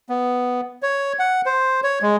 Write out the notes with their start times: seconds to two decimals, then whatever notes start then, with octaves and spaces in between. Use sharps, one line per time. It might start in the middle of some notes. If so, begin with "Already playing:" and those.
0.09 B3
0.83 C#5
1.19 F#5
1.46 C5
1.84 C#5
2.02 G#3